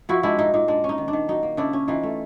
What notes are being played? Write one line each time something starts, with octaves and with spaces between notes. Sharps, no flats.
F3 E4 F#4
G#3 D4 E4
A#2 D#4
A#2 D#4
G#3 D4
C#4
D#4
D#3
D4
D#3
F#3 D#4
A#3
C#3 D4 E4
C#4
E3 D#4 F4
A3